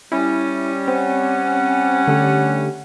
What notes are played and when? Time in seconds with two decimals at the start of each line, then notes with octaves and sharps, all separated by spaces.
0.12 G3 C#4 E4
0.88 C4 F#5
2.07 D3 A3 G4